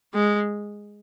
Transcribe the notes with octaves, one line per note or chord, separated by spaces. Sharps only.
G#3